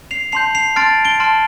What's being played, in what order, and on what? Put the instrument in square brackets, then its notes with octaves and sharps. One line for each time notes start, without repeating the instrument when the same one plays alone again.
[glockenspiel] C7 F7
A5 C6 G6 C7 F7
C7 F7
A5 C6 F6 A6 D7
D7 G7
A5 C6 F6